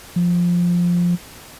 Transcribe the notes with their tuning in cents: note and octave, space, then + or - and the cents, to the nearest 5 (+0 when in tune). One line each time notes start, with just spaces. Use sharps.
F3 +5